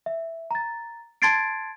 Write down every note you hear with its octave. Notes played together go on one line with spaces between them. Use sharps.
E5
A#5 A6
A5 C6 G#6 A6 C7 D7